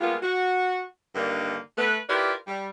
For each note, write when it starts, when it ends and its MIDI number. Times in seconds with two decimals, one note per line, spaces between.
0.01 0.15 55
0.01 0.15 56
0.01 0.15 58
0.01 0.15 59
0.01 0.15 65
0.22 0.82 66
1.15 1.56 43
1.15 1.56 50
1.15 1.56 51
1.15 1.56 58
1.15 1.56 62
1.15 1.56 63
1.78 1.98 57
1.78 1.98 71
2.09 2.33 64
2.09 2.33 65
2.09 2.33 67
2.09 2.33 70
2.09 2.33 71
2.09 2.33 74
2.47 2.69 55